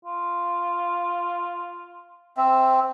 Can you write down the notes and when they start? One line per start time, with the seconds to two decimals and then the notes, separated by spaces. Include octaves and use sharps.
0.05 F4
2.37 C4 E5